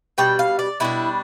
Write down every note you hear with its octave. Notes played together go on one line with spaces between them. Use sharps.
B2 G3 D4 G5
F5
D5
B2 G3 D4 E4